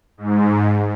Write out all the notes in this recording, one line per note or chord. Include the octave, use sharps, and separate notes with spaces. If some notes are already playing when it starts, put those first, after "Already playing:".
G#2